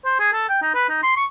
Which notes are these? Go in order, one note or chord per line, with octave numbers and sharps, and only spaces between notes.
C5
G#4
A4
G5
D#4
B4
D#4
C6
C#6